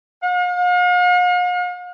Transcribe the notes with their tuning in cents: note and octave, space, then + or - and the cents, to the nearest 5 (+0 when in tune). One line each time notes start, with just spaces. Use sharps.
F5 +45